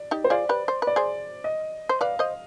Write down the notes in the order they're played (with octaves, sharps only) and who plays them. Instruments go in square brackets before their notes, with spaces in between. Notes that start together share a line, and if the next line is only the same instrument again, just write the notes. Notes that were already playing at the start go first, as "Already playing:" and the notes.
Already playing: [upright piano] D5
[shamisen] D#4 G4
[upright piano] C5
[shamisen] F4 G#4 [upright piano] D5
[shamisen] G4 B4
C5
B4
[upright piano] D5
[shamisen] G#4 C5
[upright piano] D#5
[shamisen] C5
[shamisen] B4 D5 [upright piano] F5
[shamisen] C5 D#5